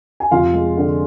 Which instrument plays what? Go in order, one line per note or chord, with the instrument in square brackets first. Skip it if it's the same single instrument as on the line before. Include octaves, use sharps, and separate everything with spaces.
[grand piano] G#5
F1 F4 F5
G#3
D3